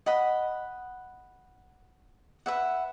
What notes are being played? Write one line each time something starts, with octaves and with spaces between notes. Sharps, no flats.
D#5 F#5 B5
B4 E5 F#5